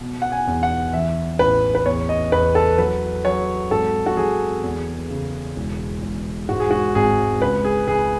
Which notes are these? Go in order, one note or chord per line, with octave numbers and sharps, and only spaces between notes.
B2
F#5
G#5
E2
F#5
E3 E5
A1 B4
B4
E2 C#5
D#5
E2 B4
A4
F#3 B4
F#3 C#5
G#1 A4
F#4
F#3 G#4
E2
C#3
E1
E1
G#2 F#4
G#4
F#4
G#1 G#4
C#2 B4
G#4
C#2 G#4